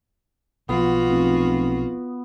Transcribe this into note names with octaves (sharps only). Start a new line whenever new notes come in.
B1 F3 B3 F4 F#4
F1